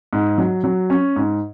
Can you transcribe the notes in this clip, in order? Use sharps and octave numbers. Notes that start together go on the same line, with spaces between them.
G#2
F#3
F#3
C#4
G#2